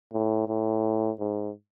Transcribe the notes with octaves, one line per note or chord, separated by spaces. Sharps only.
A2
A2
G#2